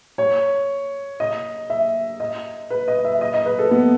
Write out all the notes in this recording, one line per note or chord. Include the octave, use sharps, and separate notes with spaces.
C#5
D#5
E5
D#5
B4
D#5
E5
D#5
D#5
B4
A4
B3